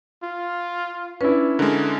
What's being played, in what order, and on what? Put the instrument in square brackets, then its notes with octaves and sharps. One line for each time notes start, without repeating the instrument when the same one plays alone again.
[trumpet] F4
[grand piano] C#4 D4 E4 [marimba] B4
[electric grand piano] D3 G#3 [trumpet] A#4